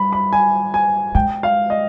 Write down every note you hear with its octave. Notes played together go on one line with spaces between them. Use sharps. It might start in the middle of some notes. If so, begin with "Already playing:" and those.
Already playing: G3 B5
B5
G#5
G#5
G#3 G5
F5
D#5